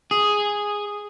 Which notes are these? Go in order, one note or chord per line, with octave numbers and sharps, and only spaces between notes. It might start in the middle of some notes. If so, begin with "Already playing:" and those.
G#4